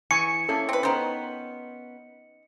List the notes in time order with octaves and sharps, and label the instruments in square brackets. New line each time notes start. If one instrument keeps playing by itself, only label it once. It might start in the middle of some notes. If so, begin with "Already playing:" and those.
[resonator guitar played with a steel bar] E3 [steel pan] G#5 C#6 [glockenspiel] C#7
[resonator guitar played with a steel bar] A#3 C#4 E4 [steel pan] A4
[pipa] C4 B4
[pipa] D#3 C5 [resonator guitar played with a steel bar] B3 C#4